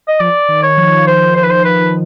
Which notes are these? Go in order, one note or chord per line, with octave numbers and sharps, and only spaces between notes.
D#5
F3 D5
D#3
C#5
F3
C5
C5
B4
C5
B4